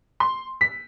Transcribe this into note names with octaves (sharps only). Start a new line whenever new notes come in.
C6
B6